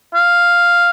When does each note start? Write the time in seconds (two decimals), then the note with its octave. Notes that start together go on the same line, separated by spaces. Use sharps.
0.14 F5